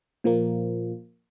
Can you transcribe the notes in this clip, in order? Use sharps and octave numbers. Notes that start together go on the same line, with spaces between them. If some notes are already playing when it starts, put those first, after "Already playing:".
A#2 F3 A#3